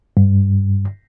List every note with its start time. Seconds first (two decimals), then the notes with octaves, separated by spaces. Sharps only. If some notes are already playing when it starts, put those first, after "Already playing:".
0.17 G2